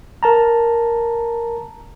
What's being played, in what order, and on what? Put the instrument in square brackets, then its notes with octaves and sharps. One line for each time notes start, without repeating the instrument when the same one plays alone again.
[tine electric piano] A#4 A5 A#5